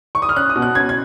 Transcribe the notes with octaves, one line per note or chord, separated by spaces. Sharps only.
C#6
D#6
F6
C#4 F#6
D#6
B2
F#6
C#4 G#6
G#6